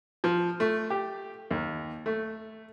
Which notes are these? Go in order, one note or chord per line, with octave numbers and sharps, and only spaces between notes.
F3
A3
G4
D#2
A3